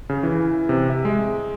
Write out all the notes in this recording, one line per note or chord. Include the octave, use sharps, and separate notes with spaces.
C#3
E3
C3
E5
G#3